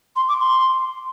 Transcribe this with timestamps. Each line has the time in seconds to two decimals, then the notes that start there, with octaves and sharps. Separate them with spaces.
0.16 C6
0.28 D6
0.40 C6